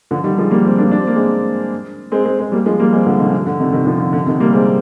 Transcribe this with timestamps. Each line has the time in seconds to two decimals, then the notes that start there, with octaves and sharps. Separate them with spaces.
0.11 D3 F3
0.24 D#3 G3
0.38 F3 G#3
0.51 G3 A#3
0.64 G#3 C4
0.78 A#3 D4
0.91 D4
1.00 C4
1.07 A#3
1.16 G#3 C4
2.12 G#3 C4
2.25 G#3 C4
2.39 G#3 C4
2.52 G3 A#3
2.66 F3 G#3
2.79 G3 A#3
2.93 G#3 C4
3.06 D3 F3
3.19 C3 D#3
3.33 D3
3.47 D3
3.60 C3 D#3
3.73 C3 D#3
3.86 D3 F3
4.00 D3
4.13 D3
4.27 C3 D#3
4.40 G3 A#3
4.53 G#3 C4